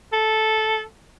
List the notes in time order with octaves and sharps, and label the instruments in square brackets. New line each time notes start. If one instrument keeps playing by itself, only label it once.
[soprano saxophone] A4